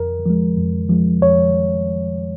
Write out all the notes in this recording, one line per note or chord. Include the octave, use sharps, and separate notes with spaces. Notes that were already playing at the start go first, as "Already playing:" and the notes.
Already playing: F2 A#4
F3 G#3
F2
F3 G#3
F2 C#5